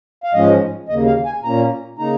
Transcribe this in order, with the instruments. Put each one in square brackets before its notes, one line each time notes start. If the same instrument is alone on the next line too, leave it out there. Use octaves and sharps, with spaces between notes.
[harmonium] F5
G#2 F3 G#3 C#4 D#5
D#2 C#3 A#3 D#5
F5
G#5
A#2 A#3 C#4 A#5
C#3 A#3 D#4 A#5